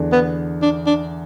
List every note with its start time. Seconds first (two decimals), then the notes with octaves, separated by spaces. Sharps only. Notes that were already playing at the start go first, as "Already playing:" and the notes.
Already playing: E2 D3 D4
0.12 B3
0.62 D4
0.87 D4